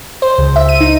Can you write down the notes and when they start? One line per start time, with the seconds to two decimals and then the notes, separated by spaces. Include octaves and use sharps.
0.22 C5
0.38 C#2
0.56 E5
0.69 D#7
0.81 D#4